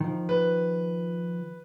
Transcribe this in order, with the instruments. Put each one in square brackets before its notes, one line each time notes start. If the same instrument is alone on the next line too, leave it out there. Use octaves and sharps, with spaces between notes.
[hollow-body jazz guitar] D#3 F3
[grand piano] B4